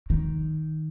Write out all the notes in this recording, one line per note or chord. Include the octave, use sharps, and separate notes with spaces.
D#3